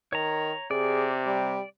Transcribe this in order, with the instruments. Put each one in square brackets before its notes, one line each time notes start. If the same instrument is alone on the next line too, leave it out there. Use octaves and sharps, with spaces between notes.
[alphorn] D#3 [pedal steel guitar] C#5 A#5
[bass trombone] C3 [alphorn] G#4 [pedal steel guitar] D5
[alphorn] G3